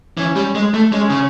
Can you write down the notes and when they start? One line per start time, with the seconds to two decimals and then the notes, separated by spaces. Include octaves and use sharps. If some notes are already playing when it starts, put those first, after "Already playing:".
0.17 E3 C#4
0.36 G3
0.55 G#3
0.74 A3
0.92 G#3 C#4
1.10 C#3